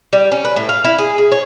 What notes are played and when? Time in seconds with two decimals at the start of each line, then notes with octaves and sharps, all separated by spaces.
0.13 G3
0.32 C#4
0.45 B4
0.56 A2
0.69 F5
0.84 E4
0.98 G#4
1.18 G#4
1.32 C#5